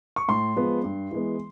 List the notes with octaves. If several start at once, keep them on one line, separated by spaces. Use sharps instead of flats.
C#6
A2 C6
F3 G#3 B3
G2
E3 G#3 B3